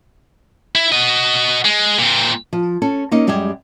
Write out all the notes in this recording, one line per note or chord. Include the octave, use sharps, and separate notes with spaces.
E4
F#4 D#5
G#3
A#2 C4
F3
C#4 A4
A#3 C#4 D#4 D#5
F#2 G3 G#3 G4 G#4